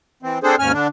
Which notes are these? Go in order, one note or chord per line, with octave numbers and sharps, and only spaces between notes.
E3 C4
C4 D4 G#4 A4 C5
D#2 G#2 C#4 G#5 F6
D3 D4